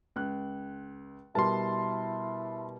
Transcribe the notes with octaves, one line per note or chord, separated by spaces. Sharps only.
C#2 F#6
B2 G3 E4 A#4 A5 C6